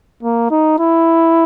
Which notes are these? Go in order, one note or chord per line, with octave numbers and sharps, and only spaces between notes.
A#3
D#4
E4